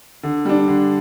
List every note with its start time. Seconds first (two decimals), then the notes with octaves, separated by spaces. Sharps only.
0.23 D3
0.45 G3 D4
0.68 D3